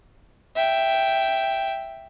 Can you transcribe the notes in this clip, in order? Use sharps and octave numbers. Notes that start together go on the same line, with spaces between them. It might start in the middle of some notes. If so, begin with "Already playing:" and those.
E5 G5